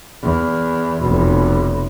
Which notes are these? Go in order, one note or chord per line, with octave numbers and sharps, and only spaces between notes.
E2
F1 B2